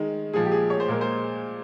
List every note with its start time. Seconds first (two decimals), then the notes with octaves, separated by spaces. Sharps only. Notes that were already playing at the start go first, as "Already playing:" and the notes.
Already playing: D#3 G#3
0.33 A#2 F3 G#3 G#4
0.45 G4
0.51 G#4
0.70 C#5
0.80 C5
0.88 A#2 G#3 A#4
1.01 C5